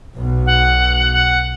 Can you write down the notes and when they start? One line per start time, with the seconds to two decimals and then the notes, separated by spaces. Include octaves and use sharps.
0.15 B1 B2
0.46 F#5
1.13 F#5